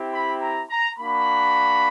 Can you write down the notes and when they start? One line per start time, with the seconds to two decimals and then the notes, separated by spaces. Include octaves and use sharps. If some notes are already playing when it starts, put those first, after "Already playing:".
Already playing: C4 E4 G4
0.12 B5
0.41 A#5
0.69 A#5
0.99 A#3 D4 F#4 B5